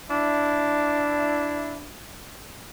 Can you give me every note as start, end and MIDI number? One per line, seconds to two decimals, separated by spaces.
0.10 1.90 62
0.10 1.90 64